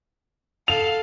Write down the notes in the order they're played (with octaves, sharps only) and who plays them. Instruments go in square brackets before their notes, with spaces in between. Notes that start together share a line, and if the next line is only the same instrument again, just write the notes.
[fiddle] A4 F5 [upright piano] F7